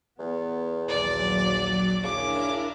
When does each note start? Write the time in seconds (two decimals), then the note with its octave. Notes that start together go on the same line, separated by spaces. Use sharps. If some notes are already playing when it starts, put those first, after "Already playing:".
0.19 E2 B3
0.89 A#1 D#2 F#3 D5 D6
2.04 C#3 D4 E4 A#4 D6